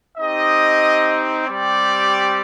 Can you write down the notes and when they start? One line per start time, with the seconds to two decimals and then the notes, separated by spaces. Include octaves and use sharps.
0.17 C4 D#4 G4 D#5
1.47 G3 C4 G4 D5